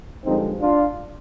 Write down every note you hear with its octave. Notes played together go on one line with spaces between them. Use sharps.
G2 D3 F3 G#3 C4 D#4
D4 F4